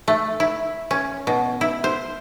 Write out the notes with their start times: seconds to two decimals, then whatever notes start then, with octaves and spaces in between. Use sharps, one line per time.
0.08 A3
0.40 E4
0.91 C#4
1.27 B2
1.61 E4
1.84 C5